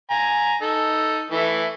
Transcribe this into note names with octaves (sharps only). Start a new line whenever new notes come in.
G#5 A#5
D#4 A4
E3 A3 E4